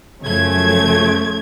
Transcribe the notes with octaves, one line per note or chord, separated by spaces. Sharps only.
F#2 C#3 F3 A3 G#6